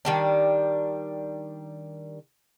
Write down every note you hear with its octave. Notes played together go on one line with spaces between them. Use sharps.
D#3 G3 D4